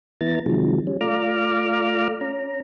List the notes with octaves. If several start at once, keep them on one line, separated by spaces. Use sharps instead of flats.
E3 B3 E4 A#5 A6
C3 D#3 F3 F#3 G#3
G3 C#4
A3 F4 D5 A#5 D6 F6
C#4 A#5